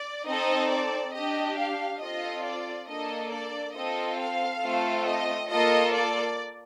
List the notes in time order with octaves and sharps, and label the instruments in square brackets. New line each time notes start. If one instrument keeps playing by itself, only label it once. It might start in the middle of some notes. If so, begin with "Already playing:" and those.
Already playing: [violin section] D5
C4 D#4 A4 D#5
D5
D4 G4 D#5
F5
C4 F4 A4 D#5
D5
A#3 D4 A4 D#5
D5
C4 F4 A4 D#5
F5
A3 C4 F4 A4
D#5
A#3 F4 A4 D#5
D5